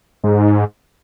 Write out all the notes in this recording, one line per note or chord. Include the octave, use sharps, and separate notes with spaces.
G#2